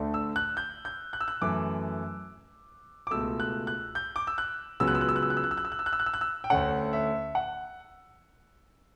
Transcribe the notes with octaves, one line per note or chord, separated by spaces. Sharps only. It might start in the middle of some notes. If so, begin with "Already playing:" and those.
Already playing: D2 D3 A3 D4
E6
F#6
G6
G6
F#6
E6
F#6
F#2 E3 A3 D6
D6
C#2 B2 A3 E6
F#6
F#6
G6
D6
E6
F#6
C#2 C#3 F#3 B3 E6
F#6
E6
F#6
E6
F#6
E6
F#6
E6
F#6
E6
F#6
E6
F#6
E6
F#6
E6
F#6
E6
F#6
E6
G5
D2 D3 A3 C#4 F#5
E5
F#5